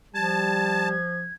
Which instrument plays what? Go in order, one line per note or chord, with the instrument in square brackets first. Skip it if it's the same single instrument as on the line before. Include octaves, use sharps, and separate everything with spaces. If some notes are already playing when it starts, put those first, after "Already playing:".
[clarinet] F3 [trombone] G3 [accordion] A5 [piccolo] G#6